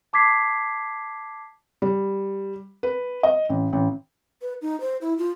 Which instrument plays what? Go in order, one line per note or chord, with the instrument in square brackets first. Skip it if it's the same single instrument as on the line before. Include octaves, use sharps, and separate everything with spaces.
[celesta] A5 D6 G#6 B6 C7
[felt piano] G3
B4
D#5
A1
A1
[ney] B4
D#4
C5
E4
F4